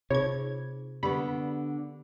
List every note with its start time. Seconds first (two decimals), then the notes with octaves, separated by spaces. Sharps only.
0.10 C3 D#4 F4 G#4 C#5 G#6
1.03 D3 B3 G4 B5